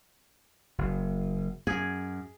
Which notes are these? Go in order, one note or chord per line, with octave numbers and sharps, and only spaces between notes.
F#1
F#2 G#4